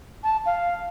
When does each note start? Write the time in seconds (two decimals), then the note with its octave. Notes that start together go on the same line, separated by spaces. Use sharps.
0.24 A5
0.46 F5